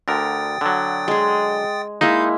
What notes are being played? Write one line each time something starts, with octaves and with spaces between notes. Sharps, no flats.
D2 D3 A#4 G5 D#6 A6
D3 F#3
G#3 G#4
G#3 A#3 D#4 E4 F5